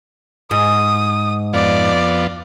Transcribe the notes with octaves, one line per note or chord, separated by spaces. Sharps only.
G#2 D#6
F2 B3 F4 D5